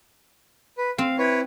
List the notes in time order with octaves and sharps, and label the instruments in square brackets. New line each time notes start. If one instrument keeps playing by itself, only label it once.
[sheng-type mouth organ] B4
[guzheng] C4 [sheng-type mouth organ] F5
[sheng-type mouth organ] E4 B4 C#5